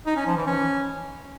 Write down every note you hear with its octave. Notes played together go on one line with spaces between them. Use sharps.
D#4
C#4
F3
E3
C#4